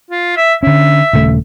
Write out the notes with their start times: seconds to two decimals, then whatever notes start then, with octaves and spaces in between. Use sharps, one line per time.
0.11 F4
0.37 E5
0.63 D3 C#4 E5
1.13 D#1 C#3 A3